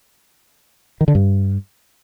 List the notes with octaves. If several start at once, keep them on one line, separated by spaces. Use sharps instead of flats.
D#3
D3
G2